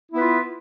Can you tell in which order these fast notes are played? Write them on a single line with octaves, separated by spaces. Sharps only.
E4 B3 B4 F4